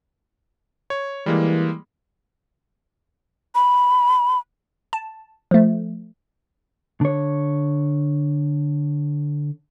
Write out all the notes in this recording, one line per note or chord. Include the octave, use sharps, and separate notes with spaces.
C#5
E3 G3 G#3 A#3
B5
A5
F3 A3
D3 C#5